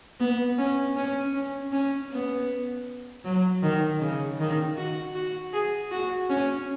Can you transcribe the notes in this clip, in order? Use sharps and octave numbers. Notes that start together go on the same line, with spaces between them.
B3
C#4
C#4
C#4
C#4
B3
F#3
D#3
C#3
D#3
F#4
F#4
G#4
F#4
C#4